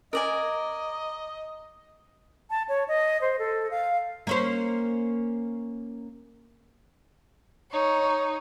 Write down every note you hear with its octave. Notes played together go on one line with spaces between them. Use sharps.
A#4 D5 D#5 G#5
A5
C#5
D#5
C5
A4
F5
A#3 C#4 C5
D#4 C#5